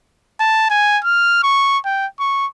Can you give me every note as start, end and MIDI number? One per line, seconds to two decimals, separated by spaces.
0.40 0.65 81
0.70 0.99 80
1.04 1.39 89
1.43 1.78 85
1.85 2.06 79
2.19 2.46 85